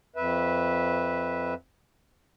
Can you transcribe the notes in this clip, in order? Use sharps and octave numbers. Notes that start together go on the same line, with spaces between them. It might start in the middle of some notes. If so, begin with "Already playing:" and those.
F2 B4 E5